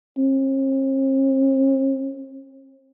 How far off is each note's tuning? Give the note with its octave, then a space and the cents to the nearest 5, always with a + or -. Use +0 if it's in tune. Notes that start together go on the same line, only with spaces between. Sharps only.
C4 +45